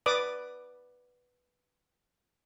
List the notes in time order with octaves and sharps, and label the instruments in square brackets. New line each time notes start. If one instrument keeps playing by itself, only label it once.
[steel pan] B4 D5 D6 D#6